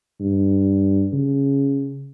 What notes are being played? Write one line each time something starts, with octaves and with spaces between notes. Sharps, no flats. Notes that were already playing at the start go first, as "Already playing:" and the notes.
G2
C#3